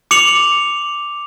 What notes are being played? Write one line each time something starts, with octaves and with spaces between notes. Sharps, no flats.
D6 C#7 F7 F#7